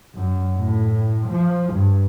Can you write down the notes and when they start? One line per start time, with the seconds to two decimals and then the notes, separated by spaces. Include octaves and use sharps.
0.15 F#2
0.57 A2
1.28 F3
1.73 G2